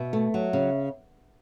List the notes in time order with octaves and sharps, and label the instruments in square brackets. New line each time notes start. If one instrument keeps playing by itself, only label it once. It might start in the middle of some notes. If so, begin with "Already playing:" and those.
Already playing: [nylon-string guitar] B2 [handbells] E5
[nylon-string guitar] A3
F#3
C#3